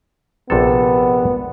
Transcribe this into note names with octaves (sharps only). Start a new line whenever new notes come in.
A#1 C3 B3 A4